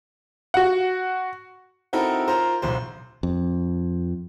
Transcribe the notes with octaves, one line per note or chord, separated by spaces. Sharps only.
F#4 F#5
C4 D#4 E4 F#4 A4 A#4
F4 A#4 C5 A#5
D1 B1 C5
F2